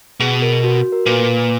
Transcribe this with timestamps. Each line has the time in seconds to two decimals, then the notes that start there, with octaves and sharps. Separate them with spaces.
0.20 B2 G#4
0.42 A#4
0.64 F#4
0.77 F#4
0.92 A#4
1.06 A#2 B4